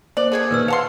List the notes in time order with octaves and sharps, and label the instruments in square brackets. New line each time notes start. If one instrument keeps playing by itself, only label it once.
[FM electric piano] A#3 [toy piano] C5 [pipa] D5
[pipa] D3 A3 D4 [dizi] G#4
[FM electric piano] A#2 D#3 [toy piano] A#4 B4 E6
[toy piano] B4 [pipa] F5 A5 C6 [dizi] F#5 [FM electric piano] C#7